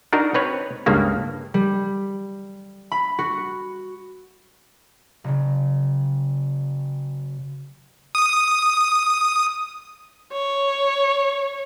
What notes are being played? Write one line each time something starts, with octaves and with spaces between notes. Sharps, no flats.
D4 D#4 F#4 A#4
C4 B4 C#5
C#2 G2 C#3 A#3
G3
B5
F#4
F#1 C#3
D#6
C#5